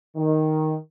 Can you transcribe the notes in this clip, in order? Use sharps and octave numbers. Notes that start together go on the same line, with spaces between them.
D#3